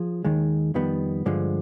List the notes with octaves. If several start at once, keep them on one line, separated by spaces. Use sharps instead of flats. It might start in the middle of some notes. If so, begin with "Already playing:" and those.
Already playing: F3 G#4
D#2 D#3 G#3
F2 D#3 G3 B3
G2 D3 F3 G#3